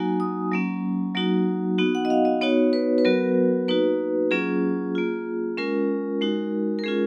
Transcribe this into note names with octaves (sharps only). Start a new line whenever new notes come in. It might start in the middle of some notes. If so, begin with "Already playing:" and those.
Already playing: F#3 A#3 D#4 F#4 G#5
D#6
F#3 A#3 C#4
F#3 A#3 D#4 F#4
B3 D#4 F#4
F#5
D#5
F5
D#5
B3 D#4 F#4 C#5
B4
B4
F#3 B3 F#4 A#4
A#3 D#4 F#4 B4
F#3 A#3 C#4 F4 G#4
A#3 F4
G#3 C#4 F4 A#4
G#3 D#4 F#4
A#4
G#3 C#4 F4 G#4